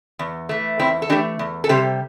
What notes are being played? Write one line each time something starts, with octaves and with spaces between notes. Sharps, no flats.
E2
E3 A3
E2 C4 E4
A4
E3 A3 D4 G4
E2
A4
C3 G3 G4 C5